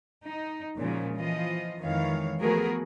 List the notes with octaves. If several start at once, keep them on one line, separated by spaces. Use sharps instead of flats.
D#4
A#2 C#3 F3 F#3 G#3 A#3
E3 F3 F4 D#5
F2 D#3 E3 G#3 C#5 F5
F3 A3 B3 F#4 G#4 A#4